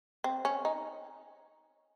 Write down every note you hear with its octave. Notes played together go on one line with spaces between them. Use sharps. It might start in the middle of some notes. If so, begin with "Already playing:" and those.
C4
C#4
D#4